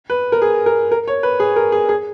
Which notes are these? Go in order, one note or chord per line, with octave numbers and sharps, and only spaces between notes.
B4
A#4
G#4
A#4
A#4
C#5
B4
G#4
A#4
G#4
G#4